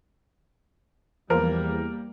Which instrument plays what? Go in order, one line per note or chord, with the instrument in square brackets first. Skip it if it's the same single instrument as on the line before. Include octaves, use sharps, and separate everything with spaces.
[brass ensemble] E2 [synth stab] F3 [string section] G3 A#3 [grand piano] A#4